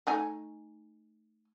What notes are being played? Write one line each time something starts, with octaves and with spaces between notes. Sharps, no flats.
A3 D#4 G#5